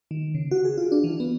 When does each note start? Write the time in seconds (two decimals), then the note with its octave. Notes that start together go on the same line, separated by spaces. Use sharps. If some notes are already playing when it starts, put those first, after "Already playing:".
0.11 D#3
0.35 C#3
0.51 F#4
0.65 G#4
0.78 F4
0.92 D4
1.04 E3
1.20 B3